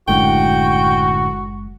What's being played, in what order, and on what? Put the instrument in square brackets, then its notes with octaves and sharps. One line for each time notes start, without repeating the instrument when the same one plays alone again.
[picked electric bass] F#1 G#3 [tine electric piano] F#2 A2 D3 [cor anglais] F#4 [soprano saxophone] G5